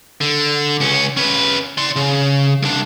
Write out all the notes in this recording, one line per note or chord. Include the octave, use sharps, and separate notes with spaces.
D3
C#2 C#4
C#4 B4
D5 C6
C#3
C2 D4